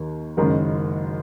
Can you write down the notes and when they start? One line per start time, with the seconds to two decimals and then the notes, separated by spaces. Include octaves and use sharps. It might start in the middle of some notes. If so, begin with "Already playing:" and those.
Already playing: D#2 D#3
0.37 F#1 F#2 D#3 G#3